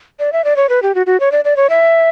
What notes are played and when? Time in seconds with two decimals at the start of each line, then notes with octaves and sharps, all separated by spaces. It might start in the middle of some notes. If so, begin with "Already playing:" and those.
0.19 D5
0.33 E5
0.44 D5
0.56 C#5
0.69 B4
0.82 G4
0.95 F#4
1.06 F#4
1.20 C#5
1.32 D5
1.45 D5
1.57 C#5
1.70 E5